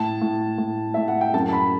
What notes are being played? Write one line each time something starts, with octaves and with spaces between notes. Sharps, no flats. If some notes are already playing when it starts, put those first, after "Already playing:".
Already playing: A2 A5
A2
A2
A2 E5
F#5
G5
F#2 A5
A5
B5